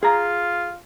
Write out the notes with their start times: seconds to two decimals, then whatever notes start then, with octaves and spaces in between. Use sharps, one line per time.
0.03 F4 G#4 A#5